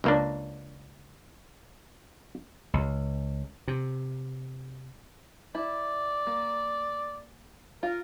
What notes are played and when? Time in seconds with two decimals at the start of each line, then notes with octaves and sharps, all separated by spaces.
0.04 C#2 A#3 D4
2.74 C#2
3.68 C3
5.55 E4 D5
6.27 A#3
7.83 F4 A#4